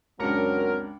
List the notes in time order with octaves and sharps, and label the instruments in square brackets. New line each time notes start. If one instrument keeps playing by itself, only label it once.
[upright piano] C#2 D4 C#7 [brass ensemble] F#2 F#3 C4 [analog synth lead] A#4